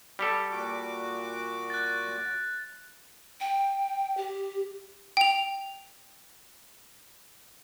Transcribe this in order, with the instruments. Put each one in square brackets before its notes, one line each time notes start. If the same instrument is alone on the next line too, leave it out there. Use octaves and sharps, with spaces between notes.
[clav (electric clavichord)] G3 G4 A4
[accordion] A#2 F#4 D6
[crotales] F#6 A6
[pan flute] G5
G4
[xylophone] G5 F7